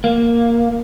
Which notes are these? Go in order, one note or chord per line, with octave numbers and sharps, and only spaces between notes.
A#3